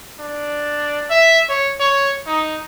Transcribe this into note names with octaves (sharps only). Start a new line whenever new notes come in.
D4
E5
C#5
C#5
D#4